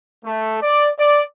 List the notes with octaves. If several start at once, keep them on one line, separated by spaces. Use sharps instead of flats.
A3
D5
D5